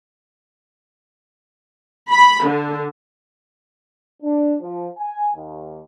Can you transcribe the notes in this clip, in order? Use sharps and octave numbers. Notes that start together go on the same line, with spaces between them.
B5
D3
D4
F3
G#5
D#2